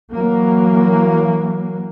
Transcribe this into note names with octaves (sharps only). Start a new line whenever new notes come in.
E3 F#3 A#3